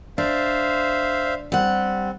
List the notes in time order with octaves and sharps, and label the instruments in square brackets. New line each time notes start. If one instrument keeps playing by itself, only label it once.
[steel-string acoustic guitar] D4 [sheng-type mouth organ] C5 E5 F5
[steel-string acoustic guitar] G3 F#5 [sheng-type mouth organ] C4